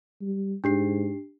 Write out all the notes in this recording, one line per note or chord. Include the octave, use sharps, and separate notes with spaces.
G3
G#2 D4 G4 C7